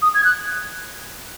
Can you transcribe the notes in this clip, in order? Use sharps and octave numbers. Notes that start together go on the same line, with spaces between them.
D#6
G#6
F#6